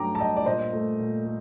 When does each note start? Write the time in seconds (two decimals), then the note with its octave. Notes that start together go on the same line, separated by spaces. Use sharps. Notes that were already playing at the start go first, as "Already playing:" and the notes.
Already playing: G2 F#3 A3 G5 A#5 D6
0.15 A5
0.20 G2 D#5 G5
0.36 D5
0.46 A#2 C5 D#5
0.73 A3
1.00 A#2
1.25 A3